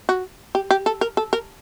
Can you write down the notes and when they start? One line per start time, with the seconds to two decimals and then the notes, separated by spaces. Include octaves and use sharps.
0.09 F#4
0.55 G4
0.71 G4
0.86 A4
1.01 A#4
1.17 A4
1.33 A#4